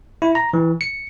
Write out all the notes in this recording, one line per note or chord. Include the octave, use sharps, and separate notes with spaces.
E4
A#5
E3
C#7